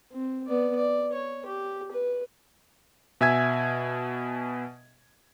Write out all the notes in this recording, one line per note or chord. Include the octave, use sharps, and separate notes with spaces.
C4
B3 D5
D5
C#5
G4
B4
B2 E5 G#5 G#6